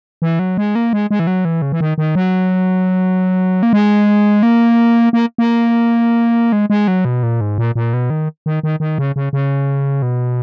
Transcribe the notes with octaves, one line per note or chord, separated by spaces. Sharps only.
E3
F#3
G#3
A#3
G#3
G#3
E3
F#3
E3
C#3
E3
D#3
D#3
F#3
A#3
G#3
A#3
A#3
A#3
G#3
G#3
F#3
B2
A#2
G#2
A#2
A#2
B2
D#3
D#3
D#3
D#3
C#3
C#3
C#3
B2